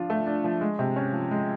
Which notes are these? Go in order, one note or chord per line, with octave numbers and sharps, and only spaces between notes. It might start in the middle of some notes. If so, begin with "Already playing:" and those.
Already playing: F3 D4 F4
A3
D4
F3
G#3
C3
C#4
F3
G#3